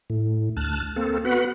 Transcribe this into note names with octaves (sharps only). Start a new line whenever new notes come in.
A2
D2 A5 F6 F#6
A#3 C4 A4
B3 F#4 B4 F#5